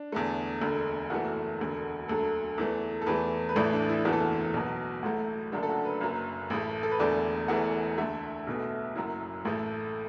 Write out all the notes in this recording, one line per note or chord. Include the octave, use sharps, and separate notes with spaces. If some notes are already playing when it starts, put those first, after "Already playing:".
Already playing: D4
E2 D3 A3
E1 D2 D3
F#1 E2 E3 A3 F#4
E1 D2 D3
E1 D2 D3 F#3 A3 A4
E2 E3 A3
A4
E2 E3 A3 B4
B4
A1 A2 E3 A3 D5
D4
E4
F#1 E2 E3 A3 F#4
A4
F#4
B1 B2 F#3
A1 A2 F#3 A3 F#4
F#1 F#2 D3 F#3 A3 D4
A4
F#4
B4
F#1 F#2 F#3
A1 A2 A3
A4
B4
E1 E2 D3 A3 D5
E1 E2 E3 A3 F#5
D2 D3 A3 E5
B1 B2 A3
F#1 F#2 F#3 E4
A1 A2 A3